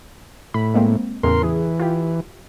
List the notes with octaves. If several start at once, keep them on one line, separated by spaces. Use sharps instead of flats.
A2 B5
G#3 A#3 C4
E2 A2 C#3 A#4 C6
E3 G#4
F4 G4